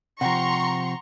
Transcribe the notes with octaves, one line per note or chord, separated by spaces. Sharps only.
C3 F3 F#5 G5 A#5 C6 C#6 A#6